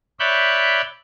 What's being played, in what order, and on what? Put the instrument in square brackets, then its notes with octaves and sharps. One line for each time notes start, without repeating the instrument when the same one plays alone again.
[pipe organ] C#5 D5 E5 B5 F#6 G6